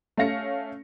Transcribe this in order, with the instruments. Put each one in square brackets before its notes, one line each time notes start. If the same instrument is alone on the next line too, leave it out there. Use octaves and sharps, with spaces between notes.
[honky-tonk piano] A3 C#4 F5 A#6 C#7